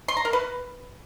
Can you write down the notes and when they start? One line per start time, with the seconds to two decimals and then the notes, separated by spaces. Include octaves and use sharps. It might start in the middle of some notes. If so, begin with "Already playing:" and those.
0.08 C6
0.17 A#5
0.25 A#4
0.33 B4